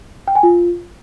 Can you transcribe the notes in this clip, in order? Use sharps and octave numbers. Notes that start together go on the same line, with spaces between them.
G5
G#5
F4